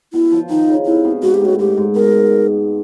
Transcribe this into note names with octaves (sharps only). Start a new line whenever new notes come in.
B2 E4
F3
D#3 D#4
C#3
C3 E4
B2
G#2 F#4
G4
A2 F#4
G#2 G4
G#2
B2 A#4